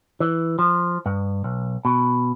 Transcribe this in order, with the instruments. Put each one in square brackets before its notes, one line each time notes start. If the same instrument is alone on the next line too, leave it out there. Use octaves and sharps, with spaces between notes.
[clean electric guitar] E3
F3
G2
B1
B2